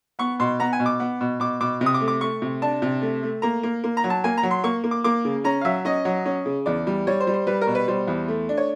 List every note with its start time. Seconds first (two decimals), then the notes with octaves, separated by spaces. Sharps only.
0.19 B3 C#6
0.40 B2 C6
0.60 B3 A#5
0.73 G#5
0.80 B2
0.86 D6
1.00 B3
1.21 B2
1.40 B2 D6
1.60 B2 D6
1.81 C3
1.86 D#6
1.94 D6
2.01 A3
2.08 D6
2.21 A3 C#6
2.42 C3
2.62 D4 A5
2.82 C3
3.02 A3
3.23 A3
3.42 A#3 A#5
3.63 A#3
3.84 A#3
3.97 A#5
4.04 F#3
4.10 A5
4.24 A#3 G#5
4.37 A#5
4.43 F#3
4.51 C6
4.64 A#3 C#6
4.84 A#3
4.91 D6
5.04 A#3 D6
5.25 C#3
5.44 C#4 A#5
5.61 F5
5.65 F#3 E5
5.85 C#4 D#5
6.05 F#3
6.26 C#4
6.46 C#3
6.66 E2 D5
6.87 G3
7.07 G3 C#5
7.20 C5
7.27 G3
7.34 C5
7.47 G3 B4
7.61 A#4
7.67 B2
7.75 B4
7.88 G3 C5
8.08 E2
8.28 A3
8.49 D4
8.57 C#5